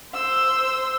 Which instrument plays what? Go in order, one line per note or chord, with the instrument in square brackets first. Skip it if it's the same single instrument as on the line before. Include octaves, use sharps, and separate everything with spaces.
[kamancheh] C5 E6